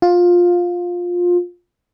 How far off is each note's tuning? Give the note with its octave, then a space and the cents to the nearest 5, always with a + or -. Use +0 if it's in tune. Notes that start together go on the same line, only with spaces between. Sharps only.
F4 +15